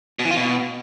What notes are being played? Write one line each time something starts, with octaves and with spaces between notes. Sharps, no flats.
B2
E3
F4
B2